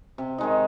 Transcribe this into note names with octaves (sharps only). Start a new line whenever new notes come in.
C3
D#3 G#3 D#4